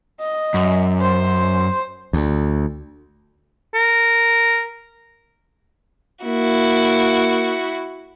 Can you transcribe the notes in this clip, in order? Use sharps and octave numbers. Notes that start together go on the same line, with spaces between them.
D#5
F#2
C5
D2
A#4
A#3 E4 F#4